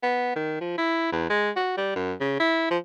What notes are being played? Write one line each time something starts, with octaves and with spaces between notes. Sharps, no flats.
B3
D#3
F3
E4
E2
G#3
F#4
G3
F#2
C#3
E4
F3